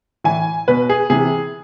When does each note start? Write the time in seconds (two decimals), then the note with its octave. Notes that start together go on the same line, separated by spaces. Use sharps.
0.24 A2 E3 G#5
0.68 B2 B4
0.89 G#4
1.10 C3 E3 G#4